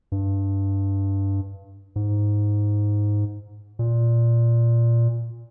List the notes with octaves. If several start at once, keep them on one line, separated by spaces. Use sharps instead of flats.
G2
G#2
A#2